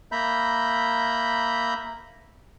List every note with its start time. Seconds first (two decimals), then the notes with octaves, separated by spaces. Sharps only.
0.12 A#3 E5 A#5 B5 G6